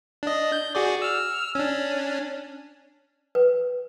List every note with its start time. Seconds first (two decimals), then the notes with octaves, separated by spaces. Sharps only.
0.23 D4 D#5
0.52 G6
0.75 F#4 G#4 D5
1.02 E6 F6
1.55 C#4 D4
3.35 B4